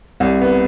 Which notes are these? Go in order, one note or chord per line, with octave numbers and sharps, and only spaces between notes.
C2
B3